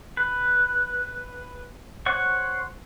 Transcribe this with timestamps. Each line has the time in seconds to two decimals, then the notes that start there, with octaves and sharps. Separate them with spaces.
0.17 B4
2.06 C5 C#5 F#5 C#6